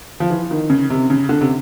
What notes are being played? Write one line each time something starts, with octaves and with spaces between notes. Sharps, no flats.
F3
E3
D#3
C#3
C3
C#3
D3
C3